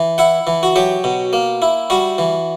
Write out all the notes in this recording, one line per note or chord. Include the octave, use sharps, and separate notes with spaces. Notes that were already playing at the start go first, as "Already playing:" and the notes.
Already playing: E3
E4 F#5
E3
F#4
F#3 G4
B2
A#3
E4
G3 F#4
E3